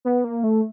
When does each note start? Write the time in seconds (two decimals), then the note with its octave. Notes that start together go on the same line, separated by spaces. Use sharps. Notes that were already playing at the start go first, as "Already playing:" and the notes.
0.05 B3
0.24 A#3
0.44 A3